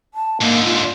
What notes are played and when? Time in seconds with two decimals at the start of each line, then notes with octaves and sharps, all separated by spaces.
0.14 A5
0.41 G#2 D3 A#3
0.65 F4